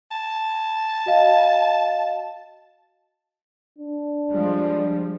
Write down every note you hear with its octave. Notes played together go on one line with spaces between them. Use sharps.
A5
F#4 D#5 F5
D4
F3 G3 G#3